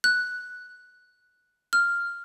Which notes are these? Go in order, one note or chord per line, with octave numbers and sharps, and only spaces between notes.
F#6
F6